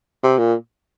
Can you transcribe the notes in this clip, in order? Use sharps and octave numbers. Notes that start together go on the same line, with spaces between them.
C3
A#2